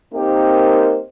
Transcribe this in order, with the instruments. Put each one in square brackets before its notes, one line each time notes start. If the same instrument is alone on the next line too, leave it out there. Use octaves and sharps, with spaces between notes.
[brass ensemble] A#3 C4 D#4 G4 A#4 C5